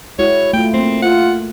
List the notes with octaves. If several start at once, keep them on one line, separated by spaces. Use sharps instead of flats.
G#3 E4 F#4 C#5
A3 F4 G5
A3 A#3 C4
F4 F#5